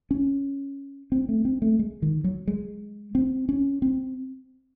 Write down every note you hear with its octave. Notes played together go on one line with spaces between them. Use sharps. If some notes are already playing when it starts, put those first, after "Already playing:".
C#4
C4
A3
C4
A3
G#3
D#3
F#3
G#3
C4
C#4
C4